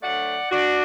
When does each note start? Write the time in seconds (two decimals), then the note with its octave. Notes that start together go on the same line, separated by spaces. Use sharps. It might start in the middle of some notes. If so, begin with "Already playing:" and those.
0.02 D2 D3 F#3 A3 D5 F#5
0.51 D4 F#4